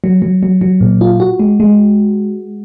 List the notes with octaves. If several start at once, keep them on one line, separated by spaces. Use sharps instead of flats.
F#3
F#3
F#3
F#3
A#2
F4
F#4
G#3
G#3